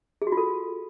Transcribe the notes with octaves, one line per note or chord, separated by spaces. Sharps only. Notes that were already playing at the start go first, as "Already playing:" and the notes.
G#4
F#4
F4
A4